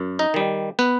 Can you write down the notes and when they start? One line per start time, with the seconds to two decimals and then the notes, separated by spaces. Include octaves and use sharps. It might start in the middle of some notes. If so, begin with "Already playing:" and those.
Already playing: F#2
0.19 D#4 D#5
0.34 D#3 G3
0.79 B3 B4